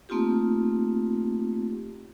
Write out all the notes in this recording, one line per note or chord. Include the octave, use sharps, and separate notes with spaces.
A3 A#3 C4 D#4 F4 G4